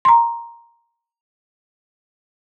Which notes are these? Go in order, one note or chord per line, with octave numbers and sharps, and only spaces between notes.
A#5 C6